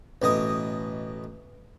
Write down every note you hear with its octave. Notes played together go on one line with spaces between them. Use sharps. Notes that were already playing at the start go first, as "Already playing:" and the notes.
A1 B2 D#5 D#6